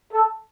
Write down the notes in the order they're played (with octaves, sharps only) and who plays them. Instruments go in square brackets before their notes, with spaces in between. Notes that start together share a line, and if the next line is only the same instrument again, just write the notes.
[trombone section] A4